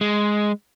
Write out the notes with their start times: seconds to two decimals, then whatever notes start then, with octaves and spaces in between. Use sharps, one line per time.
0.01 G#3